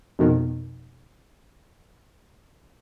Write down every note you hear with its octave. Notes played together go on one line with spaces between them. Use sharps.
F2 B2 D#3